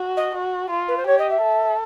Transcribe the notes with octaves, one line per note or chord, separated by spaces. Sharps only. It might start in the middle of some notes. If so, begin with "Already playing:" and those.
Already playing: F#4
D#5
F#4
F4
B4
C5
G4 C#5
D#5
E5
A4